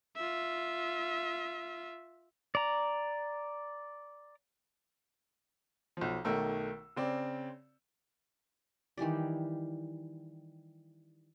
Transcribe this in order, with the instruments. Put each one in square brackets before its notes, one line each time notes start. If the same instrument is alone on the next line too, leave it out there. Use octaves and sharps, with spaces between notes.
[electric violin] F4 E5
[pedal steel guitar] D5 A#5
[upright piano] B1 F3
B1 D#3 A3 A#4 E6
C#3 C4 D5
[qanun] D#3 E3 G3 D5